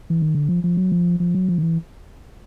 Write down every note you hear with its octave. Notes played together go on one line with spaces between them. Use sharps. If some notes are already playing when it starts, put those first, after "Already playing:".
E3
D#3
D3
F3
F3
F#3
F3
F3
F#3
F3
D#3
E3